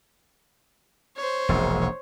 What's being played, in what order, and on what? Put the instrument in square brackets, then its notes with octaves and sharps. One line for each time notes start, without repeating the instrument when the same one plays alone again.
[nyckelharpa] C5 C#5
[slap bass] E1 A#1